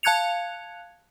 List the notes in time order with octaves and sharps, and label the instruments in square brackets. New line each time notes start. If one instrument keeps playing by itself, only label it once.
[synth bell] F5 A5 F#6 G#6 C#7 F7